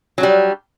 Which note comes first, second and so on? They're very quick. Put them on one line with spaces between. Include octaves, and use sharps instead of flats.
F#3 D4 G3